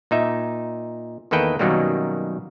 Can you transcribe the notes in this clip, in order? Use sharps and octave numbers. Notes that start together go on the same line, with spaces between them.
A#2 D#4 E5
E2 D#3 A#3 A4 B4 G5
F#2 B2 D#3 F#3 G3 A#3